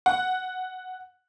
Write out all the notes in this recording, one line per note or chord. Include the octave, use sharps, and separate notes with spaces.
F#5